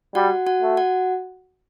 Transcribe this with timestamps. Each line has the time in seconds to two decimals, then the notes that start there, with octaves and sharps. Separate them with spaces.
0.15 G3 F#4 F#5
0.47 F#4 F#5
0.62 A3
0.77 F#4 F#5